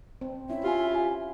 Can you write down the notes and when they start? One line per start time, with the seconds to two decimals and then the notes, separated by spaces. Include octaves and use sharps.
0.21 C4
0.50 C#4 E4 E5
0.64 F4 G4 G#5
0.95 G#5